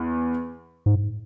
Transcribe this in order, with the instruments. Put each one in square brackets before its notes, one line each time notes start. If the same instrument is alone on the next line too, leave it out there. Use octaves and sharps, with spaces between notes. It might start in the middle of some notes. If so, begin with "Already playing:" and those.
Already playing: [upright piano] E2
[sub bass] G#2